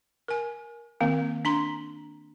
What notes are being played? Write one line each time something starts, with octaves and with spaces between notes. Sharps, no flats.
A#4 G#5
D#3 A#3 C4
D4 A#5 C6